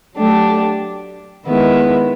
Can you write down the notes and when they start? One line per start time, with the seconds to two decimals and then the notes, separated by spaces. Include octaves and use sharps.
0.15 F#3 A3 D4 G4
1.46 D#3 G#3 B3 E4